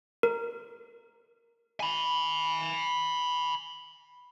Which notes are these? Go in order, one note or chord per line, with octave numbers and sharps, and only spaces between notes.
A#4
G#5 B5